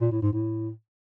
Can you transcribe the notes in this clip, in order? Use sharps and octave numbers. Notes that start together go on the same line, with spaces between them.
A#2
A2
G#2
A2